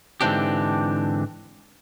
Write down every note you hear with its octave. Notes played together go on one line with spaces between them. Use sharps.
G#2 D3 E3 C4 D4 G4